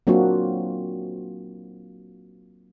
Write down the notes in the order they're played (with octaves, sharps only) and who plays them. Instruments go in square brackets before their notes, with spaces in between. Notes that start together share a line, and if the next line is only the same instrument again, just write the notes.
[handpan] F#3 A#3 C4 D4 F4 F#4